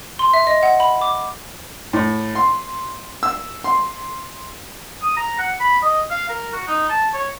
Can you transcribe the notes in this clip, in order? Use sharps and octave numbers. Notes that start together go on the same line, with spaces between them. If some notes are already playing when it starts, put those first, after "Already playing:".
C6
E5
D#5
F#5
B5
D6
A2
C6
E6
C6
D#6
A#5
F#5
B5
D#5
F5
A#4
F#4
D#4
A5
C#5